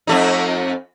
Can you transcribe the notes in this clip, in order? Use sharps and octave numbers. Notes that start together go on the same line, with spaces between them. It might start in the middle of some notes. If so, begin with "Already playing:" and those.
F2 A3 D#4